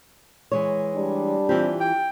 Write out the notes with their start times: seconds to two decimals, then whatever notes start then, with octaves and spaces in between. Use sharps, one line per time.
0.52 E3 G#3 C#5
0.96 G3 D4
1.49 E3 C4 F4 G4
1.80 G5